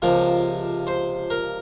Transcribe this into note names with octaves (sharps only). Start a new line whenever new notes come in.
C#2 C3 F3 A#4
C5
A#4